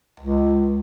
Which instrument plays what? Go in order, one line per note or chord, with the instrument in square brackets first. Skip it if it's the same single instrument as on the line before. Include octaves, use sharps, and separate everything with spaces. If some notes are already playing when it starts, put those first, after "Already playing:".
[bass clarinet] C#2